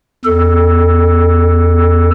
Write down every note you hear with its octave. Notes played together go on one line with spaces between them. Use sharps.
E2 A4